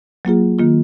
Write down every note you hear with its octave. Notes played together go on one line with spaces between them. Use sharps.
F#3 A#3 F4 G#4
D#3 A#3 F4